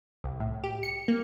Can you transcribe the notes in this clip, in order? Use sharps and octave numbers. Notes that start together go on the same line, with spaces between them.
C2
A2
G4
C#7
A#3